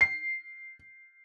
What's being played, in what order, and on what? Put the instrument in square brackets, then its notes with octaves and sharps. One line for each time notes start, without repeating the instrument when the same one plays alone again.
[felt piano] C7